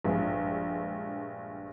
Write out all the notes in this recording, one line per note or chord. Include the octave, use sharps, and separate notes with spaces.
A#1 G2 G#3